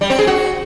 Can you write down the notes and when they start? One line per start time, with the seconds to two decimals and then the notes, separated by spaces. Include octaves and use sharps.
0.01 G3
0.10 C4
0.18 G#4
0.27 F#4